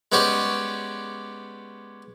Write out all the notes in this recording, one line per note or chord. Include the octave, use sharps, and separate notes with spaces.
G#3 B3 C#4 G4 D5 C#6